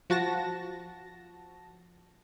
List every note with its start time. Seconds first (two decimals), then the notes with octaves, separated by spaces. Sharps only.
0.10 F3 F#4 A5 A#6